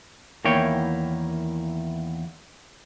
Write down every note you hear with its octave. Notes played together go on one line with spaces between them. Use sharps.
E2 D#3 A#3 E4 C#5 G5